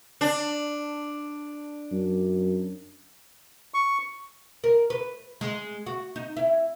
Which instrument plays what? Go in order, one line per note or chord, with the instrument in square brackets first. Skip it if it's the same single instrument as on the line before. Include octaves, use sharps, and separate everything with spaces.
[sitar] D4
[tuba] F#2
[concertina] C#6
[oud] A#4
B4
G#3
F#4
D#4
E4